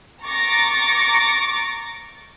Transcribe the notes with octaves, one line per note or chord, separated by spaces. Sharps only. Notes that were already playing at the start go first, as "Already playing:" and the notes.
A#5 C#6 D6 A6 A#6